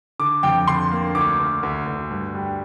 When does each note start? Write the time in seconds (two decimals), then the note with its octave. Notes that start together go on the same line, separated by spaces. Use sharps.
0.19 D3 D6
0.43 F2 G5
0.67 D3 C6
0.91 A#3
1.15 D2 D6
1.39 D2
1.63 D2
1.87 D2
2.11 G2
2.35 G3